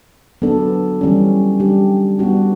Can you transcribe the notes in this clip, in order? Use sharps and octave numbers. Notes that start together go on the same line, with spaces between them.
F#3 B3 D4 A4
E3 G3 C#4
G3 D4 G4
G3 B3 D4 F#4